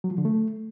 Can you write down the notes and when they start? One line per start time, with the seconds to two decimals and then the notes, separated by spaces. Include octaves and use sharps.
0.04 F#3
0.11 F3
0.18 D3
0.25 A3